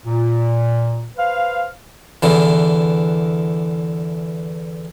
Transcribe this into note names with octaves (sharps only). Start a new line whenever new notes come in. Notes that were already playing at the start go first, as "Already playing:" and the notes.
A#2
B4 C5 F5
E2 D3 E3